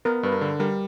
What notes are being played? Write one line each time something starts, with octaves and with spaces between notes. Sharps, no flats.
B3 A#4
G2 B4
A#4
D3
G3 A#4